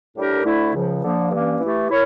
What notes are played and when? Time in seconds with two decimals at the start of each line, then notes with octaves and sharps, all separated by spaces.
0.16 A2 G3 D4 G4 A#4
0.45 D2 D3 A3 E4
0.74 C#2 C#3 F3
1.03 D3 F3 A#3
1.31 G2 E3 A#3 C#4
1.60 E3 A3 E4 G4
1.89 E4 A#4 C#5